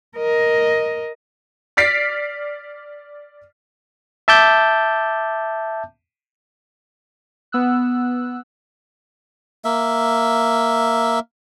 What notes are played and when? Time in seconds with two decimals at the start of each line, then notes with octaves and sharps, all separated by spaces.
0.17 A#4 D#5
1.77 D5 F6 A6 B6 C7 D7
4.28 E5 A5 D6 G6
7.52 B3 E6 F#6
9.65 A#3 E5